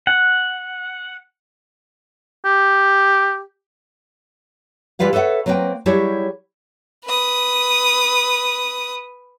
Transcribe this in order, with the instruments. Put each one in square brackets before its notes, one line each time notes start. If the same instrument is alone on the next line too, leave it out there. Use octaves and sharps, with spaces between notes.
[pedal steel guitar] F#5
[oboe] G4
[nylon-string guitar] E3 G3 F4 B4 F5 F#5
A4 B4 C#5 E5 F#5
F#3 A#3 C4 B4 G5
F#3 G3 E4 G4 G#4 C#5
[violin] B4 D#6